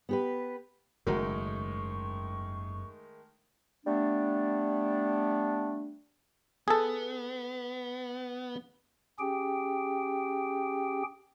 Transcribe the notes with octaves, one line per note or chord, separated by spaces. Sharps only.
B3 G4 B4
F#1 G#2 D#3 G#3 A3 F#4 A#4 C#6
G3 A3 B3 D4
B3 G#4 A4
C#4 G4 G#4 G5